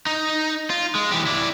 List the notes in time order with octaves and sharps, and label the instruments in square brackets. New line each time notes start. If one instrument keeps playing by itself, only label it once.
[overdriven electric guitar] D#4
F4
G#3
E3 G4
E4 D5